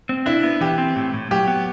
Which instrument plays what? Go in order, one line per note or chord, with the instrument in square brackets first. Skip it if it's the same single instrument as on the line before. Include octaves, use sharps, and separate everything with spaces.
[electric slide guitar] C4
[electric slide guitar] D4 [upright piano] E4
[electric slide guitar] B3
[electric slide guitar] E3 [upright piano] G4
[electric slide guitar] C4
A2
A2
[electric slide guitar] F#3 [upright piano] G4
[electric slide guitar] B3